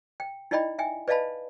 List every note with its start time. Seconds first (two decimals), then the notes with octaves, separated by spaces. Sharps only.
0.20 G5
0.51 D#4 E4 D5 D#5 G5 B5
0.79 E5 G5 G#5
1.08 B4 D5 D#5 F5 A5 B5